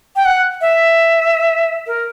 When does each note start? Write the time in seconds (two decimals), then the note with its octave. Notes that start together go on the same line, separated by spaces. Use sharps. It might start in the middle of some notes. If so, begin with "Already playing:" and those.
0.16 G5
0.25 F#5
0.61 E5
1.87 A#4